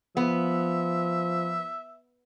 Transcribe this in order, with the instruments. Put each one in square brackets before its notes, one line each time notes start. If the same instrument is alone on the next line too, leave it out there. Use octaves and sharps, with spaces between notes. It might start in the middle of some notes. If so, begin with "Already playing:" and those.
[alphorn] F3 [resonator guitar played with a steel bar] B3 [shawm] E5